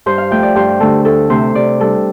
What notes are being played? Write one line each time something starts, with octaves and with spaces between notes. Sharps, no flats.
G2 C5
F5
F3 A3 G5
D5
G2 C5
D3 A3 D4 A4
D2 A4
C3 A3 C5
C3 D5
G3 D4 A4